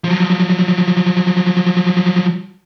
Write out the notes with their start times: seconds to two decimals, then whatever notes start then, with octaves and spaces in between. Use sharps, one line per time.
0.04 F3 F#3